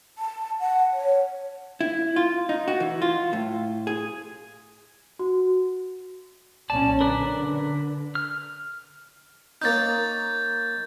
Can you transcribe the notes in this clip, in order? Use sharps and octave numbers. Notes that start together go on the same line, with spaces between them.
A5
F#5
C#5
E4
F4
D#4
F#4
E3
F4
A2
G#4
F#4
B1 A#2 C#4 D5 A5
D3 A#4 B4 D5
F6
A#3 C#4 D#4 G6 A6